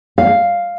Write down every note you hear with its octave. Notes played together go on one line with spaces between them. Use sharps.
F5